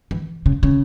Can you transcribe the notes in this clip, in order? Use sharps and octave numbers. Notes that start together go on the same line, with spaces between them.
E3
C#3
C#3